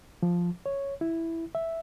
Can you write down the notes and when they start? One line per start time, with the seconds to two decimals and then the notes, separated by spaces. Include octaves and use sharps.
0.23 F3
0.66 C#5
1.01 E4
1.55 E5